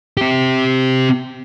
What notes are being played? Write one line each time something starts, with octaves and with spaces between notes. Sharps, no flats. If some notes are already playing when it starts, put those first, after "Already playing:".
C4 G4